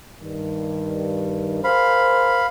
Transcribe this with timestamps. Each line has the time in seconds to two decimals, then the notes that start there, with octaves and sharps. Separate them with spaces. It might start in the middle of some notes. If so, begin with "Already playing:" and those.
0.20 G2 D#3
1.64 G#4 A#4 C5 F5 B5